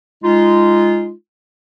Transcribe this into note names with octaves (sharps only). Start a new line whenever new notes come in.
G#3 D#4 F4